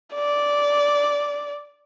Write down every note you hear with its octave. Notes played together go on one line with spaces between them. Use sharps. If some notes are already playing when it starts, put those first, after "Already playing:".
D5